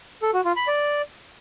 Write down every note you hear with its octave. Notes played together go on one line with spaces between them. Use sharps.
A4
F#4
F4
B5
D5